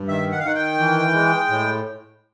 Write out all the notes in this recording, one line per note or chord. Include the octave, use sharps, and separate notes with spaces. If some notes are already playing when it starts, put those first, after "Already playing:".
Already playing: G2
D#3 E5
F#5
F5
D#3 F#5
G5
E3
G#3
A2